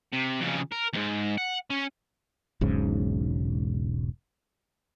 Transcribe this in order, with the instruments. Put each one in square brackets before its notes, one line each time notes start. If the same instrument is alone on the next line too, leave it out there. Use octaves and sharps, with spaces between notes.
[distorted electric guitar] C3
F2 C#3
A#4
D#2 G#2
F#5
C#4
[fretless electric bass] E1 B1 G#2 C#3